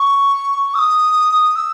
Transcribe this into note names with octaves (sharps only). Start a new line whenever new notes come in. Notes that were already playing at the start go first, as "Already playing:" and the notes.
Already playing: C#6
E6
D#6
E6